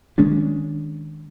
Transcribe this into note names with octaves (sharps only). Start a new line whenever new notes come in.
D#3 G#3 C#4 D4